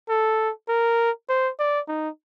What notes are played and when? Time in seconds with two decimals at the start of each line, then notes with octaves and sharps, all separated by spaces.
0.09 A4
0.69 A#4
1.29 C5
1.60 D5
1.88 D#4